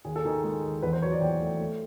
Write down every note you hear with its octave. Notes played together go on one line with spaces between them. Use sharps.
D#2 G#4
A4
D#3 G#4
G#3
D#2
E2 B4
C5
F#3 C#5
D5
E2 G5
A3
A3